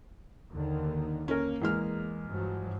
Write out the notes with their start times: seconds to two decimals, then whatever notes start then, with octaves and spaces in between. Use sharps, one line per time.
0.51 D#2 D3 D#3
1.28 A#3 C#4 A#4
1.62 E2 G#3 F6
2.28 G2 F3 F#3